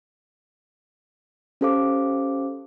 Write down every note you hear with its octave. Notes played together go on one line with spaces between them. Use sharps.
C#4 G4 A4 C5 F5 D6